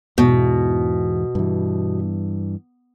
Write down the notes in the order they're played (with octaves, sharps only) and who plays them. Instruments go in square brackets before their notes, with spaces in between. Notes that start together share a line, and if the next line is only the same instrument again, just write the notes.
[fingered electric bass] E2 G#2 E3 [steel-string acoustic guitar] B2
[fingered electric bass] G2 E3